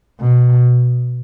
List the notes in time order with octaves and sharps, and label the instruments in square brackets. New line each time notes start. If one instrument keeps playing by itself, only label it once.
[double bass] B2